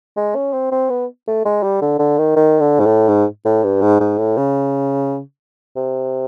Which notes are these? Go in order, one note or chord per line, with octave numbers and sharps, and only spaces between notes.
G#3
C#4
C4
C4
B3
A3
G#3
G3
D3
D3
D#3
D#3
D3
G#2
A2
G#2
A2
G2
G#2
G#2
A2
C#3
C3